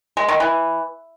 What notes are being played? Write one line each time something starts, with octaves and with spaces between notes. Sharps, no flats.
G#3
D#3
E3